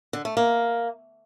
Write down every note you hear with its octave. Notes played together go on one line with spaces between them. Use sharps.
D3
A3
A#3